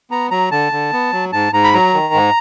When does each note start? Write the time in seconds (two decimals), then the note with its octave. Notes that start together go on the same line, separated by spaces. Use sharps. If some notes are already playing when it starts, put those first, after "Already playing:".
0.11 B3 A#5
0.31 F#3 A#5
0.51 D3 A5
0.72 D3
0.93 B3
1.12 F#3
1.33 G#2 A5
1.53 G#2 A#5
1.64 B5
1.74 F#3 A#5
1.94 D#3
2.14 G#2